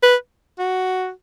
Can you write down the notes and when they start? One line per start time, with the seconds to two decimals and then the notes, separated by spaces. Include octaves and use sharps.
0.03 B4
0.59 F#4